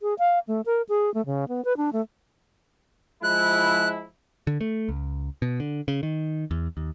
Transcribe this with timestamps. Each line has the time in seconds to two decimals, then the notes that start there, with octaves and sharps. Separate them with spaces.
0.01 G#4
0.19 F5
0.47 A3
0.66 A#4
0.89 G#4
1.14 A3
1.26 C#3
1.48 B3
1.65 B4
1.77 D4
1.93 A3
3.23 F3 G#3 E4 F#6
4.47 D3
4.61 A3
4.89 C#2
5.42 B2
5.60 D3
5.88 C#3
6.03 D#3
6.51 E2
6.77 D#2